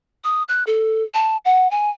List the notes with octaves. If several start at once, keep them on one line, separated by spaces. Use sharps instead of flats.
D#6
F#6
A4
A5
F#5
G#5